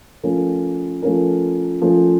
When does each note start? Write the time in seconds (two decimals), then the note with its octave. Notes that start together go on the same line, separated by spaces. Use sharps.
0.23 F3 A3 C#4 F4 A#4
1.03 F3 A3 C#4 F4 A#4
1.82 F3 A3 C#4 F4 A#4